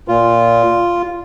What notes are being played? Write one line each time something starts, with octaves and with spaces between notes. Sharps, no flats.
A#2 F4